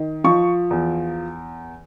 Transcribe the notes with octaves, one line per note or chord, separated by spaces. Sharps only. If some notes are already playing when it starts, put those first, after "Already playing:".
Already playing: D#3
F3 C#6
E2